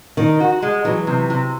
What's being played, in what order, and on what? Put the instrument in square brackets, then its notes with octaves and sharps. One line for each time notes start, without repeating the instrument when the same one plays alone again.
[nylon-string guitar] D#3 [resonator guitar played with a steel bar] D#4
[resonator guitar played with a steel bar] F#4
G#3
[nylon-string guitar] E3 [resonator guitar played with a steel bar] F#3
[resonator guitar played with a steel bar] C3
C3